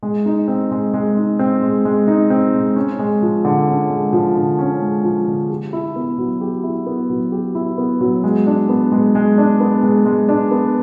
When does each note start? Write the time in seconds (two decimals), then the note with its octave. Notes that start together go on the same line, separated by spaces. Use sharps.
0.03 G#3
0.26 D#4
0.48 C4
0.71 G#3
0.94 G#3
1.16 D#4
1.39 C4
1.63 G#3
1.85 G#3
2.07 D#4
2.30 C4
2.54 G#3
2.76 C#4
2.99 G#3
3.22 F3
3.45 D3
3.67 C#4
3.90 G#3
4.13 F3
4.36 D3
4.59 C#4
4.82 G#3
5.04 F3
5.27 D3
5.50 G4
5.73 E4
5.96 B3
6.18 F#3
6.41 G4
6.63 E4
6.86 B3
7.10 F#3
7.32 G4
7.55 E4
7.78 B3
8.01 F#3
8.24 G#3
8.47 D4
8.69 B3
8.92 G#3
9.15 G#3
9.38 D4
9.61 B3
9.83 G#3
10.06 G#3
10.28 D4
10.51 B3